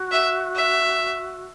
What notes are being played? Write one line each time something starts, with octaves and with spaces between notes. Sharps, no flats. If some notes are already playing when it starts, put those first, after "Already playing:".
Already playing: F#4
E5
E5